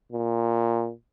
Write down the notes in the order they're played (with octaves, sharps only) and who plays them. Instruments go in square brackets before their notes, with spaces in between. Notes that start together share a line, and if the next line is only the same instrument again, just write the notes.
[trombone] A#2